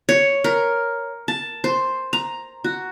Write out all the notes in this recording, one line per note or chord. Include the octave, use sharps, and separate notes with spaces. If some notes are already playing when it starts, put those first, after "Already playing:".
C#5
A#4
A5
C5
A#5
F#4